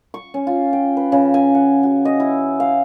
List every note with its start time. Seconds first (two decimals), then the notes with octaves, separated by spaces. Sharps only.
0.14 C#6
0.34 C#4
0.47 F4
0.73 G5
0.97 B4
1.12 C#3
1.34 G#5
1.55 F#5
1.83 F#4
2.05 D#5
2.20 E4
2.60 F5